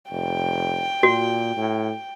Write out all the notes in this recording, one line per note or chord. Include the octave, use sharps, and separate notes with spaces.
F1 G5
A#2 F#4
A2